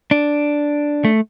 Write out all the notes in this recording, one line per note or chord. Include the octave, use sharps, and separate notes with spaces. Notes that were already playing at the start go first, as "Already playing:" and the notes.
D4
A3